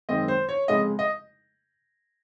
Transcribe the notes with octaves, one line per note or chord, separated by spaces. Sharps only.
F#2 D#3 G#3 C4 D#5
C5
C#5
F2 C#3 G#3 D#5
D#5